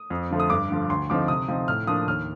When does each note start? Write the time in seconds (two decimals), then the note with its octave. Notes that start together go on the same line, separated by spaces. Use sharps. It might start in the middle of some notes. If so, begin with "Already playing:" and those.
Already playing: D#6
0.10 F2
0.31 D3 F3 A3
0.40 D#6
0.50 G2 D6
0.70 D3 F3
0.89 D2 C6
1.10 D3 F3 C4 D#4 D6
1.28 C3 D#6
1.48 F3 C4 D#4
1.68 A2 F6
1.87 F3 A#3 D4 D#6
2.07 D#2 F6